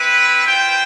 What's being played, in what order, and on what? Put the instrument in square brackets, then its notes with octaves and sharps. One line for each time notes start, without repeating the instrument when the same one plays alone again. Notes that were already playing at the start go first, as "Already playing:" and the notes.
Already playing: [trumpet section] C4 E4 B4
F4 C5 G5